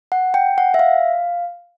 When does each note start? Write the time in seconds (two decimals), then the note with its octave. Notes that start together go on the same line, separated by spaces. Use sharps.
0.12 F#5
0.34 G5
0.58 F#5
0.74 E5
0.79 F5